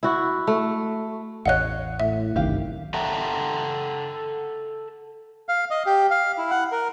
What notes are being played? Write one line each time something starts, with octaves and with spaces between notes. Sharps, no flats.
E4 F#4
A3
A1 E2 C#5 D#5 F5 F#5 F#6
A2 E5
G1 C2 F#2 D#3 G4 F5
A4 E5 F#5 G5 A#5
F5
D#5
G4
F5
E4
F#5
A#4